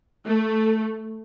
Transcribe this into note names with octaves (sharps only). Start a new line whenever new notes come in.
A3